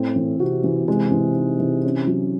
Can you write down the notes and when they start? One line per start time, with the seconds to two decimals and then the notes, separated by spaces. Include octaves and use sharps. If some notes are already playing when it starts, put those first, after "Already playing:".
Already playing: A2 C4
0.16 E3
0.40 C3 F#4
0.64 E3
0.88 C3 G#3
1.12 E3
1.35 D#4
1.60 E3
1.84 C#4
2.07 F#3